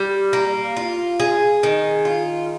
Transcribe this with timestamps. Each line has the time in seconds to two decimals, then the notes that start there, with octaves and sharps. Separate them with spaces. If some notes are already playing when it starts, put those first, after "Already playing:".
Already playing: G3
0.33 A#3
0.77 F4
1.20 G#4
1.63 D#3
2.05 F4